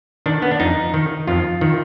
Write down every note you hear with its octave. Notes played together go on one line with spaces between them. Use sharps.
D#3 D4
B3
D4
F2 D#4
D#3
F2 F4
D#3